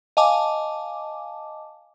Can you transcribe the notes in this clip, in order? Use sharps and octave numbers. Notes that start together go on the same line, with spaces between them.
D#5 F5 G#5 A5 D6